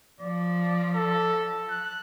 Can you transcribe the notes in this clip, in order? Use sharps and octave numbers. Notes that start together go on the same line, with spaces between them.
F3 D5
A4
F#6